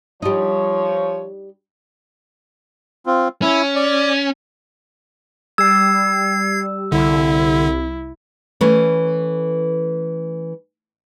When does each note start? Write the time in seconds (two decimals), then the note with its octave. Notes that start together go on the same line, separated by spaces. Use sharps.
0.22 F3 G3 D#4 C#5
3.06 C4 F4
3.42 C#4 E4
3.75 D5
5.58 G3 E6 G#6 C7
6.92 C2 D3 E4
8.61 E3 A3 C#4